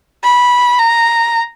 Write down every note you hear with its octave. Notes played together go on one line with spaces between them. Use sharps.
B5
A#5